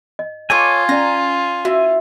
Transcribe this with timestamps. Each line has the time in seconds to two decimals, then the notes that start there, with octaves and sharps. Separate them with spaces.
0.19 D#5
0.50 F4 A4 C#5 G#5 D6
0.89 C#4 D5 A#5
1.65 E4 F#4 E5